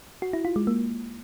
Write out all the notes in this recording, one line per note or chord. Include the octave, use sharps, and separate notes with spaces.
F#4
E4
F4
G#3
A#3